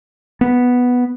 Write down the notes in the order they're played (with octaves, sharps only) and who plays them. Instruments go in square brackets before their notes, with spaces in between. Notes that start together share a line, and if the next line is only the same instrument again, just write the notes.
[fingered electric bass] B3